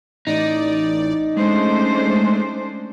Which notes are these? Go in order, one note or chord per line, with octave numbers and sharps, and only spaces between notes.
A1 D#4 D5
G#3 A3 C#4 D4 C5